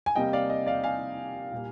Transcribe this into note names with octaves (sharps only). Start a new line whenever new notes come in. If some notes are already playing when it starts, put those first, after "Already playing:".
G#5
C3 G3 A#3 D#5 G5
D5 F5
D#5
D5 F5
F5 G#5
A#2 G3 A#3